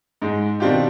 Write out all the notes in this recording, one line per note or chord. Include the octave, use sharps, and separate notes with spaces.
G#2 G#3
B2 D#3 C4 D4 F4 G4